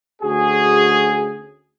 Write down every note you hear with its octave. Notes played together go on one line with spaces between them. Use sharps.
D2 C#4 F#4 G#4